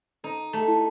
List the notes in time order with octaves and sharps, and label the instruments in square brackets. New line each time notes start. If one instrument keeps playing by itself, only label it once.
[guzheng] D#4 [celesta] A4
[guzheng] A3
[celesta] E4